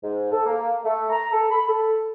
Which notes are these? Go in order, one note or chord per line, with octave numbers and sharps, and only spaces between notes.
G#2
A4
A#3
A3
A#5
A4
B5
A4